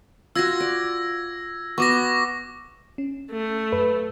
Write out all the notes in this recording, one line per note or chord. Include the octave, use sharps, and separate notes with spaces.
F4 F#4 E6 G#6 A#6
D5
B3 F#4 C#6 D6 A#6
C#4
A3
F#2 B4